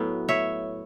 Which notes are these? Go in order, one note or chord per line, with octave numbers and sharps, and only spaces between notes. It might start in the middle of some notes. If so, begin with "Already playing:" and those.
Already playing: A2 F#3 B3
C#5 E5